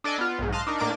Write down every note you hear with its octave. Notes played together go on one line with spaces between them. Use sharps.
D4 A4 D5 D#5 G#5
B3 F4
B1 G#2
D#5 F5 A5 C6 F#6 A6
D4 D#4 A#4
A2 A#3 D4 D6 A6 D#7